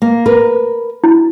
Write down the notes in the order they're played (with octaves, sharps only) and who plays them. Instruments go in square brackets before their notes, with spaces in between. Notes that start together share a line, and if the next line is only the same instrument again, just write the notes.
[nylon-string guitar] A#3
A#4 B4
[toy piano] E4